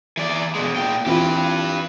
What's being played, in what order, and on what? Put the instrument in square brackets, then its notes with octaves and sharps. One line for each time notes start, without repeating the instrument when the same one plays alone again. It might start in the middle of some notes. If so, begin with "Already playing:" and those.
[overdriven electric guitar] E3 D5
B2 G#3
A#2 G5
[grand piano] E3 C4 F4 [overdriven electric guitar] G4 B4